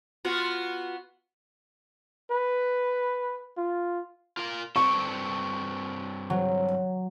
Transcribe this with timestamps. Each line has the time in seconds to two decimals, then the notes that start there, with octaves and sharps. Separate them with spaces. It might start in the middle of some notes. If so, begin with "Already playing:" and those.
0.25 B3 F4 F#4
2.31 B4
3.57 F4
4.37 F4 A#4 F5
4.76 G2 C4 A4 C#6
6.30 F#3